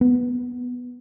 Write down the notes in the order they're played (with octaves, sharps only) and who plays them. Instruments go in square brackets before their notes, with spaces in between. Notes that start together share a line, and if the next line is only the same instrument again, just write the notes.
[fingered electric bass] B3